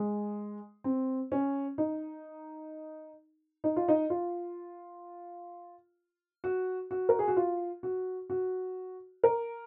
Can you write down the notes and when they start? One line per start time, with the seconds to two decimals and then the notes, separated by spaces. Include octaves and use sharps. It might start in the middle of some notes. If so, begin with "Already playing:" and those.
Already playing: G#3
0.84 C4
1.32 C#4
1.78 D#4
3.64 D#4
3.76 F4
3.88 D#4
4.10 F4
6.44 F#4
6.91 F#4
7.09 A#4
7.19 G#4
7.28 F#4
7.37 F4
7.83 F#4
8.30 F#4
9.24 A#4